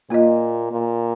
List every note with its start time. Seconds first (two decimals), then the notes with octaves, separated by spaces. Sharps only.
0.10 A#2 A#3 F4 D#5
0.71 A#2